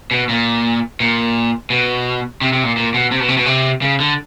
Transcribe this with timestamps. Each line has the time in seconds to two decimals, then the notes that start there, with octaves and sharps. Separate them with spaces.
0.11 B2
0.29 A#2
1.00 A#2
1.70 B2
2.41 C3
2.53 C3
2.64 A#2
2.77 A#2
2.94 B2
3.12 C3
3.20 B2
3.28 C3
3.37 B2
3.46 C3
3.82 C#3
4.00 D3